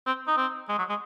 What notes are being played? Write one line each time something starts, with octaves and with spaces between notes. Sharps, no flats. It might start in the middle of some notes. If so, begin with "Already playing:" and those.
C4
D#4
C4
G#3
F#3
G#3